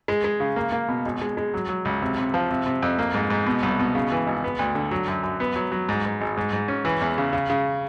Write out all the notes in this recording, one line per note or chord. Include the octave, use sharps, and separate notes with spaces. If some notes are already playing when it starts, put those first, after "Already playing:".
G#3
G#3
C#3
A#3
A#3
B2
G#1
G#3
G#3
F#3
F#3
C#2
C3
C3
F3
C3
C3
F2
A#3
G#2
G#2
B2
C2
B2
C#3
E3
G#1
B3
D2
D3
F#3
F#2
F#2
B3
F#3
F#3
G#2
G#2
G#1
G#2
G#2
C#4
E3
E2
C#3
C#3
C#3